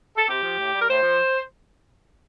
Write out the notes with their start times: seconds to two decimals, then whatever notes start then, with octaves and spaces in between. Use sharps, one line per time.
0.16 A4
0.28 C3 G4
0.43 F3
0.58 A2
0.73 G3
0.80 A#4
0.88 A2 C5
1.03 F3